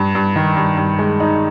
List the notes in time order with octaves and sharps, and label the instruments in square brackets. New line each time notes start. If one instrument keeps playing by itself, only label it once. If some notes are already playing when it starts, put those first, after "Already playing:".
Already playing: [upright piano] G2
G2
D#3
G2
G2
G#3
D#4